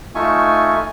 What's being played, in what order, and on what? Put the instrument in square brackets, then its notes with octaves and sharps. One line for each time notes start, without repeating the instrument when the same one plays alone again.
[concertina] A3 D#4 F4 E5 G#5 C#6